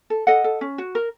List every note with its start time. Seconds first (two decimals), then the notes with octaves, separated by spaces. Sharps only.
0.10 A4
0.27 A4 D#5 F#5
0.44 A4
0.61 C#4
0.78 F#4
0.95 A#4